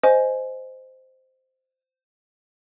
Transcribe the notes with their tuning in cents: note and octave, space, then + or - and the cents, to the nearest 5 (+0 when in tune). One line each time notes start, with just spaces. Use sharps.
C5 -10 D#5 +0 G#5 +10